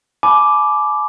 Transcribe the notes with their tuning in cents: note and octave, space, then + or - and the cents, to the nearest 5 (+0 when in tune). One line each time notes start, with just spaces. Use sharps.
G#5 +40 B5 +0 D6 +0